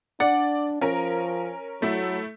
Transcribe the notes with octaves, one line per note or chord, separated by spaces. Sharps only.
D4 D5 F#5
F3 C#4 A#4
F#3 A3 E4